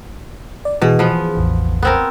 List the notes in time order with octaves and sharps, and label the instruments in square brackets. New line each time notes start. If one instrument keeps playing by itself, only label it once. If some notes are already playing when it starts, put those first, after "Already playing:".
[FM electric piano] D5
[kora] B2 [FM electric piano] E3 G#4
[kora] F3 B3
[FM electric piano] A1 E2
[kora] B3 C4 A#4